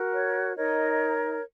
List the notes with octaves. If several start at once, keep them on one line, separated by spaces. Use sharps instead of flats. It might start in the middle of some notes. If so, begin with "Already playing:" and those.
Already playing: F#4 A#4
C#5
D#4 A#4 C#5 D#5